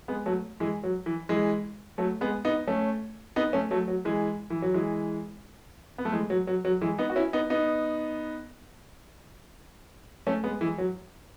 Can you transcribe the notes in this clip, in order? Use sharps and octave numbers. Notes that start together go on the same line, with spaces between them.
G#3 B3
F#3 A3
E3 G#3
F#3
E3
E3 G#3
F#3 A3
G#3 B3
B3 D#4
A3 C#4
B3 D#4
A3 C#4
F#3 A3
F#3
E3 G#3
E3
F#3
E3 G#3
B3
A3
E3 G#3
F#3
F#3
F#3
E3 G#3
B3 D#4
F#4
C#4 E4
B3 D#4
B3 D#4
A3 C#4
G#3 B3
E3 G#3
F#3